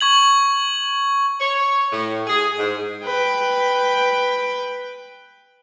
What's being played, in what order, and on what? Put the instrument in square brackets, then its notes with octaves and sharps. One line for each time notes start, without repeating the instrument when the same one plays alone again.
[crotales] C#6 G#6 F#7
[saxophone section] C#5
A2
G#4
G#2
[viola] B4 G5